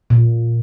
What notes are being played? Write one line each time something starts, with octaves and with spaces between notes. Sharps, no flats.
A#2